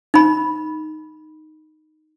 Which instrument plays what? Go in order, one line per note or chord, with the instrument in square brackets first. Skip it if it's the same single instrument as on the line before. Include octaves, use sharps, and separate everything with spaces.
[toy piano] D#4 B5